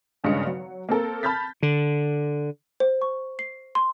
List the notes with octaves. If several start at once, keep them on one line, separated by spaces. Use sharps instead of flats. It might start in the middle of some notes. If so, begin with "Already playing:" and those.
G#1 G2 C#3 G#3 F5 C#7
F#3
A#3 C4 A4 A#4
A5 B5 F6 G6 A6 B6
D3
C5
C#6
C7
C6